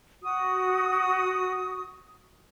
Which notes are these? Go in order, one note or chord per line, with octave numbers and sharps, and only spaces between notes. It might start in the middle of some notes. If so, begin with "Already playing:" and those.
F#4 D#6